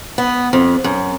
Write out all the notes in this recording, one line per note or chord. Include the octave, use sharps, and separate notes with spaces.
B3
F2
F#2